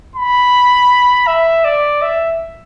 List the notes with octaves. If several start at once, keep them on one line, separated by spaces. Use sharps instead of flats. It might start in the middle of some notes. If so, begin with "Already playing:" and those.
B5
E5
D5
E5